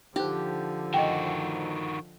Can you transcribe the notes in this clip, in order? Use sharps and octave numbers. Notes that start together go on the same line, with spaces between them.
D3 F3 D#4 G4 C5
D#3 F#4 D#5 G5